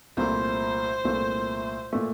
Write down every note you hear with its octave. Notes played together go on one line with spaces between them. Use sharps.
C2 A#2 A3 C5
C2 A#2 A3
A#2 A3